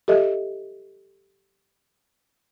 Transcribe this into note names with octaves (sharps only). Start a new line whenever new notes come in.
G4 A4 D#5 E5